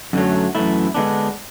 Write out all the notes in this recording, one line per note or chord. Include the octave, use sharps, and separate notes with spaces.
F#2 D3 F#3 A3
F#2 E3 A3 E4
D3 G#3 B3 D4